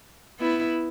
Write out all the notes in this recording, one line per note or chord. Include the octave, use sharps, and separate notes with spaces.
B3 E4